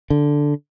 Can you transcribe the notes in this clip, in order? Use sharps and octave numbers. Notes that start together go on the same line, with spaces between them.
D3